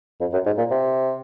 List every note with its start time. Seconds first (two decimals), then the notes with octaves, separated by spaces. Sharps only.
0.20 F2
0.33 F#2
0.46 G#2
0.58 A#2
0.71 C3